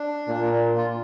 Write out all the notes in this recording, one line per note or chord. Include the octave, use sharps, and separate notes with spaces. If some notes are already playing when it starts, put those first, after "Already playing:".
Already playing: D4
A#2
F4